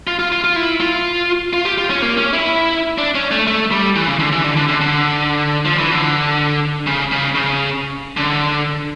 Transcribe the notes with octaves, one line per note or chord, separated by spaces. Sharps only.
F4
F4
F4
F4
E4
F4
F4
G4
F4
C#4
A#3
C#4
E4
D4
C#4
A3
A3
G3
E3
C#3
D3
E3
D3
D3
D3
D3
F3
E3
D3
C#3
C#3
C#3
D3